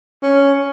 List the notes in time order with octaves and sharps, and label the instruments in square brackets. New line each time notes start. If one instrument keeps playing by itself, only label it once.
[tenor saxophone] C#4